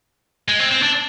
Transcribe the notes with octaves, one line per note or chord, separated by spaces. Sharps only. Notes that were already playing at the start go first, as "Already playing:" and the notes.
G#3
C4
C4
D4